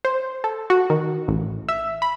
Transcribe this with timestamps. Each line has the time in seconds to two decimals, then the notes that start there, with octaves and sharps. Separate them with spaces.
0.05 C5
0.44 A4
0.70 F#4
0.90 D#3
1.28 A1
1.69 E5
2.02 B5